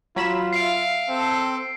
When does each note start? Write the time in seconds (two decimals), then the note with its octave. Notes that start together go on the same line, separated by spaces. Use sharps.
0.16 F#3 F4 B5 E7
0.53 E5 F5 C7 D7
1.09 C4 A4